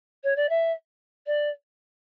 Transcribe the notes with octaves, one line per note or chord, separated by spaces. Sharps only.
C#5
D5
E5
D5